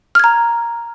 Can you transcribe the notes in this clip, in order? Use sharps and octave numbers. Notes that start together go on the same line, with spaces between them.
A#5 F6 G#6